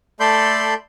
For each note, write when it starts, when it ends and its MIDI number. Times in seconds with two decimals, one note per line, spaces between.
0.20 0.74 57
0.20 0.74 69
0.20 0.74 74
0.20 0.74 83
0.20 0.74 84
0.20 0.74 91